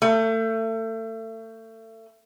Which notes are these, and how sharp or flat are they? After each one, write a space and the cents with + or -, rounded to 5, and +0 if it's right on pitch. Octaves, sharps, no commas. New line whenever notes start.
A3 +30